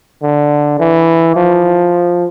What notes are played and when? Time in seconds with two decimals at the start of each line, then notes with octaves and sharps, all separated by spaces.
0.23 D3
0.80 E3
1.36 F3